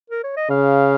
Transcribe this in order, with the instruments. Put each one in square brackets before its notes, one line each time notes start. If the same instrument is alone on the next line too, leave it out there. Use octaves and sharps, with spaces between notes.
[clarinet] A#4
C#5
D#5
[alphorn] C#3 [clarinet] F5